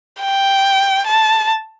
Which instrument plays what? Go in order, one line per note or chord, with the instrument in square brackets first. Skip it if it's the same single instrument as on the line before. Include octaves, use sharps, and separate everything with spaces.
[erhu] G5
A5